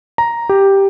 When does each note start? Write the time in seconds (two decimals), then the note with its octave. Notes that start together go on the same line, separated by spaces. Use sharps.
0.18 A#5
0.49 G4